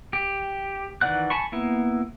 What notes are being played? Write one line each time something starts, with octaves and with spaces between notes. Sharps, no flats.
G4
D#3 E3 D5 F#5 F#6
G#5 A5 B5 C#6
A#3 B3 E4